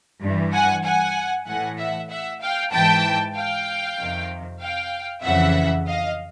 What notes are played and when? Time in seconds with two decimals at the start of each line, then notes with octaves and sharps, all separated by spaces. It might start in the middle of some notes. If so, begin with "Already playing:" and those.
0.21 G2 E3
0.53 F#5 G#5
0.84 F#5 G#5
1.46 A2 E3 F#5 G#5
1.78 E5 F#5
2.09 E5 F#5
2.41 F5 G5
2.72 G#2 E3 G5 A5
3.35 F5 G5
3.98 F2 C3 D#3
4.60 F5 G5
5.23 F2 C#3 E3 E5 F#5
5.86 D#5 F5